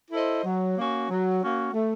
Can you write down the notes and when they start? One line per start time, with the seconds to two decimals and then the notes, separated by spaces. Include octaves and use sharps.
0.11 E4 A4 C5 D#5
0.44 F#3
0.77 A#3 C#4 F#4
1.09 F#3
1.41 A#3 C#4 F#4
1.73 A3